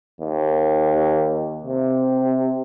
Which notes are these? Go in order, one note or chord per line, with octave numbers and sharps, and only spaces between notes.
D#2
C3